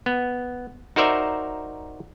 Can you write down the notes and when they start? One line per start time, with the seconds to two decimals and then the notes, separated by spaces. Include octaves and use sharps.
0.06 B3
0.96 D#4 F#4 A#4 C5 D5 E5